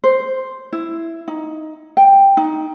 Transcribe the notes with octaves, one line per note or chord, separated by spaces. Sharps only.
C5
E4
D#4
G5
D#4